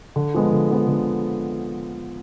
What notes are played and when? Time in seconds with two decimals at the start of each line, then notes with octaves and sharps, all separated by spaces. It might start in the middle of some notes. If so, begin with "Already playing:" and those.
0.16 D3
0.34 F3 G#3 B3
0.52 D3
0.70 F3 G#3 B3
0.88 D3